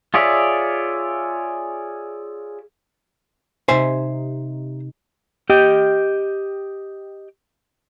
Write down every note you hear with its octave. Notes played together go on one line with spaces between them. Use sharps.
F4 G#4 C#5 D5 E5
C3 D#4 C5 E5 G#5
G4 D#5 G5